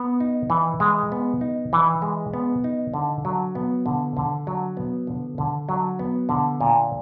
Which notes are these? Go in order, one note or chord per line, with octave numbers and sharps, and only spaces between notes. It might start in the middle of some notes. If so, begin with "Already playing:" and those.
Already playing: B3
D#4
E3
G#3
B3
D#4
E3
G#3
B3
D#4
D3
F#3
B3
D3
D3
F#3
B3
D3
D3
F#3
B3
D3
A#2